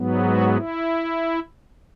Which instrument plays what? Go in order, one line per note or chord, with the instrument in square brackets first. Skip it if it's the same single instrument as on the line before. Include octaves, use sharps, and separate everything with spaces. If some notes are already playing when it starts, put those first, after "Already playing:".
Already playing: [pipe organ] G#2 F#3 B3
F#4
E4